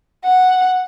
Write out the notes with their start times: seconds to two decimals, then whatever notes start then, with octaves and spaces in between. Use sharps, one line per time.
0.24 F#5